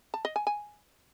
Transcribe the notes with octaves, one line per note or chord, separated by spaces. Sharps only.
A5
D#5
G#5
G#5